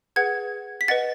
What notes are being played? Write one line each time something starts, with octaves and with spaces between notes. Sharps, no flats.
G#4 B4 F#5 G#6
B6
B4 D#5 F#5 A6